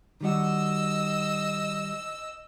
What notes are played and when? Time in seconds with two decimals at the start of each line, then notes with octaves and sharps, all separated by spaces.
0.21 D#3 G3 F#4 D#5 E6